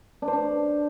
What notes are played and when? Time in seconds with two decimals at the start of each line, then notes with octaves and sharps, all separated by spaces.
0.22 D4
0.28 C5
0.33 D4